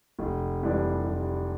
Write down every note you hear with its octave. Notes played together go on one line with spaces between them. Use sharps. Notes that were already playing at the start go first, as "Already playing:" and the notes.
F1
F2 E3 G3 D4
F1